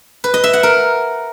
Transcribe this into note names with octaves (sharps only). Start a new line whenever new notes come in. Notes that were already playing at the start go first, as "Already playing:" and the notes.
B4
D#5
E5
F#5
A#4